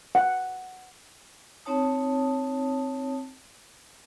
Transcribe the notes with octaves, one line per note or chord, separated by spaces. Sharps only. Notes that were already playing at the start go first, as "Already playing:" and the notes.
F#5
C4 D#4 C#5 A5 D#6